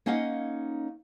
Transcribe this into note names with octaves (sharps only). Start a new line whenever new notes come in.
A#3 C#4 D#4 D#5 F5 F#5